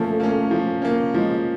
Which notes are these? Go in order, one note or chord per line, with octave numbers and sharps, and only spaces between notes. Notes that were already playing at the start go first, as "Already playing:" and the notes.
Already playing: F3 A3 A#3 C#4
A#3 C#4
F3
A#3 C#4
F3 G#3